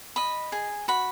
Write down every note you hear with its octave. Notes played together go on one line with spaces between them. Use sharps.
D#5 B5
G#4
F#4 B5